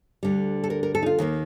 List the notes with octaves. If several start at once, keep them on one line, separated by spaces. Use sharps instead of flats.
D2 D3 G3
A4
A#4
A#4
A4
D#4
F4
D#2 D#3 G3 A#3